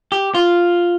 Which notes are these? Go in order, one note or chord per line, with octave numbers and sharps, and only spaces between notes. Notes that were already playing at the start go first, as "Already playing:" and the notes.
G4
F4